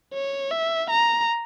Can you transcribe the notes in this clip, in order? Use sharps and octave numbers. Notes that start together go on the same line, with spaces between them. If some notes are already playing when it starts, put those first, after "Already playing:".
C#5
E5
A#5